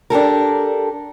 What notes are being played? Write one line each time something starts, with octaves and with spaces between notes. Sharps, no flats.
D4 G4 A4 A#4